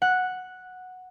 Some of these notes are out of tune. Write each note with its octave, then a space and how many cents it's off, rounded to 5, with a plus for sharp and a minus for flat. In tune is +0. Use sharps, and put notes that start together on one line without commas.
F#5 -5